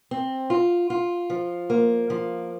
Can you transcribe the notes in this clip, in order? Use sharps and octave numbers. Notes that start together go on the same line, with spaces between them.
C4
F4
F4
F3
A#3
F3